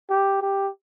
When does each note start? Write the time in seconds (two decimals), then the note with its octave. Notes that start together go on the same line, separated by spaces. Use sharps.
0.10 G4
0.42 G4